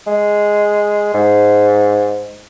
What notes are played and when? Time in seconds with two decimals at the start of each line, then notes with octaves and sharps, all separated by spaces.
0.07 G#3
1.14 G#2